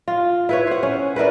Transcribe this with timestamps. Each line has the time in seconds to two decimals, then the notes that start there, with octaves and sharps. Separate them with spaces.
0.08 F4
0.49 E4 B4 C#5
0.67 C5 F#5
0.83 C#4
1.16 D4 E4 A#4 B4